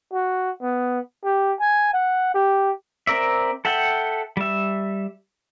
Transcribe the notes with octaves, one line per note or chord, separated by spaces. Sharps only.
F#4
B3
G4
G#5
F#5
G4
C4 A#4 D5 E5
A4 E5 F#5 G5
G3 E5